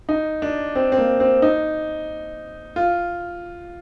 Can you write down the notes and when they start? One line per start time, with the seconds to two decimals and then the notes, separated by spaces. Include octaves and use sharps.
0.09 D#4
0.42 D4
0.75 C4
0.92 C4
0.98 A#3
1.20 C4
1.42 D#4
2.76 F4